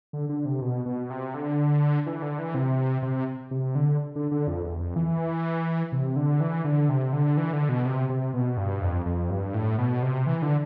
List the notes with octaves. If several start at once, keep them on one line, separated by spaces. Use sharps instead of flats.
D3
D3
C3
B2
B2
C3
D3
E3
D3
E3
C3
C3
C3
D3
D3
D3
F2
E2
F2
E3
C3
D3
E3
D3
C3
D3
E3
D3
B2
C3
C3
B2
G2
F2
F2
G2
A2
B2
C3
E3
D3